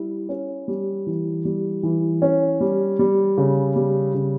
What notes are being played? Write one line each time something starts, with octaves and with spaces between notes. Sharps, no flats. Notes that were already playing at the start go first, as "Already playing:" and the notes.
Already playing: G3 E4
C#4
G3
E3
G3
E3
C#4
G3
G3
C#3
G3
C#3